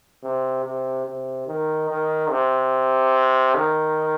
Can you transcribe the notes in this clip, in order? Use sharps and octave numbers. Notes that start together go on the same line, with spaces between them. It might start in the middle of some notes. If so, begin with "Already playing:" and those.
C3
C3
C3
D#3
D#3
C3
D#3